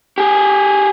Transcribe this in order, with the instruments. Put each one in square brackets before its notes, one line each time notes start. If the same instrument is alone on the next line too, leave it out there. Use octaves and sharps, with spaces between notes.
[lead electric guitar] G4 G#4